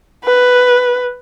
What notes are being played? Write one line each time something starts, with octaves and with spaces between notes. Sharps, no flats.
B4